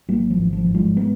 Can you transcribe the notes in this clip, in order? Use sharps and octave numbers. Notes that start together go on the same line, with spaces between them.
G#1 F#3 A#3
F3
G#1
F3
G#2
F3 G#3
G#3 B3